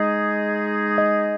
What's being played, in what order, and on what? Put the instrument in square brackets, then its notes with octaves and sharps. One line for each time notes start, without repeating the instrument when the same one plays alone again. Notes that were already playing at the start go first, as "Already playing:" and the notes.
Already playing: [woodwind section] G#3 D#4 G#4 [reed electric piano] D#5
[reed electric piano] D#5